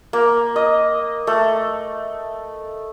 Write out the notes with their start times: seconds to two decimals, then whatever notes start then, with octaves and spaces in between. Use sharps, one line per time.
0.13 A#3
0.56 D#5
1.27 A3